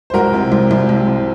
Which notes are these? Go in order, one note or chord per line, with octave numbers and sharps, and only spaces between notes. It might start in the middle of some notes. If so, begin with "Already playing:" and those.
C5
C2 F#4 A#4
C3
C2
C2
C2
C3